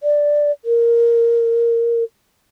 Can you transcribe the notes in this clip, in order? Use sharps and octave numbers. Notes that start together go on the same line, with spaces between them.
D5
A#4